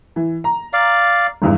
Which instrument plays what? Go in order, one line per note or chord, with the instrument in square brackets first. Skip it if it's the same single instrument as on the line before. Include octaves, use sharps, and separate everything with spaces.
[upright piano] E3
A#5
[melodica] D5 F5
[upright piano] G#1 E2 G2